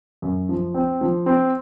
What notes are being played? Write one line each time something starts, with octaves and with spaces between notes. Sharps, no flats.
F#2
F3
C4
F3
C4